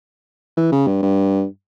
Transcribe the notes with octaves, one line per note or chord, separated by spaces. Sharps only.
E3
C#3
G2
G2